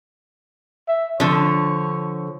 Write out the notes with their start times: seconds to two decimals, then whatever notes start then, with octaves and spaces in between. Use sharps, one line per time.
0.88 E5
1.20 D3 F3 C#5